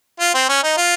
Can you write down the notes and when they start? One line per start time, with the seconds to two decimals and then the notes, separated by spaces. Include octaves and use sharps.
0.20 F4
0.34 C4
0.49 C#4
0.63 D#4
0.77 F4